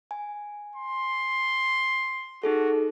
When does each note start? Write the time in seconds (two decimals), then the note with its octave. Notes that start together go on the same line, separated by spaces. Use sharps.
0.11 G#5
0.76 C6
2.43 D#4 F#4 G#4 A4